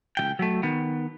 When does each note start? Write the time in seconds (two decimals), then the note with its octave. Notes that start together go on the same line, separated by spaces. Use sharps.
0.17 C#2 E3 G5
0.39 F#3 A3
0.63 D#3 B3